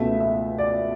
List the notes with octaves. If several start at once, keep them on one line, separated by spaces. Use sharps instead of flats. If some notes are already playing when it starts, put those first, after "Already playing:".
Already playing: C#2 B2 A3 E5
E5
D5